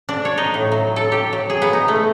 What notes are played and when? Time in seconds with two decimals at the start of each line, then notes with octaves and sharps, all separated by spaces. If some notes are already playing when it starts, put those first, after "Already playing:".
0.09 D4
0.25 C#5
0.38 D#4
0.54 A2
0.72 F#3
0.96 A4
1.12 G4
1.33 F#3
1.50 G#4
1.62 B3
1.73 D#4
1.88 A3